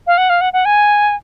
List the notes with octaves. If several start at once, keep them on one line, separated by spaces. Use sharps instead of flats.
F5
F#5
F5
F#5
F#5
G#5